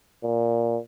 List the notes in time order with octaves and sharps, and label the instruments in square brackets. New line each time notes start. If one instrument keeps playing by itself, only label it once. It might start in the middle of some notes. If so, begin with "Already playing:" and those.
[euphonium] A#2